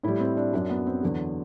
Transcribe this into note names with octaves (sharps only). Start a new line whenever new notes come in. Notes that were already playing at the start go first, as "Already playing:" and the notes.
A2 G3 E4
C4
D4
F#2 F#3 D4
B3
C4
E2 D3 F#3